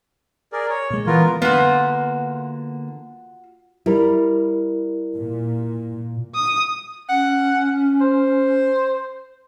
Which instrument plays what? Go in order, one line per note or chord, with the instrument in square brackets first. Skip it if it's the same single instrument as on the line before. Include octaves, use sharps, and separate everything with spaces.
[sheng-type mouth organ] G#4 A#4 D5
C#5
[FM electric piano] A#2 G#3
[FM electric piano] E3 [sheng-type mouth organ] B3 F4 A#4
[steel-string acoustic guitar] D3 A#3 [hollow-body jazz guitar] B3 [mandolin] F4 F#4
[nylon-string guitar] G3 [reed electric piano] E4 A#4
[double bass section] A#2
[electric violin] D#6
[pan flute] C#4 [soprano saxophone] F#5
[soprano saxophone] C5